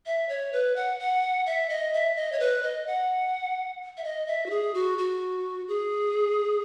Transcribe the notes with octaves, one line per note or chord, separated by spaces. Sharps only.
E5
C#5
B4
F#5
F#5
E5
D#5
E5
D#5
C#5
B4
D#5
F#5
E5
D#5
E5
F#4
G#4
F#4
F#4
G#4